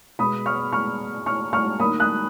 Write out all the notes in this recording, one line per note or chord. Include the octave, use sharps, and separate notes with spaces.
B2 G#3 B3 B5 D#6
C#6 F6
C#6 F6
C#6 F6
C#6 F6
D#3 A#3 B5 D#6
D#6 F#6